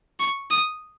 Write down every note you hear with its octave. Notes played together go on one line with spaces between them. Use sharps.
C#6
D#6